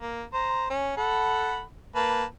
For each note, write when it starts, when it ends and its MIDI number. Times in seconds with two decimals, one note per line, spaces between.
0.01 0.23 58
0.33 0.66 72
0.33 0.66 82
0.70 0.95 61
0.97 1.62 69
0.97 1.62 78
0.97 1.62 83
1.96 2.24 58
1.96 2.24 71
1.96 2.24 81